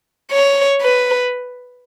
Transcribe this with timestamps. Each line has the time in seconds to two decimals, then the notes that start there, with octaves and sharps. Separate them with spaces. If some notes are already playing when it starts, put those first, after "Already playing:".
0.31 C#5
0.81 B4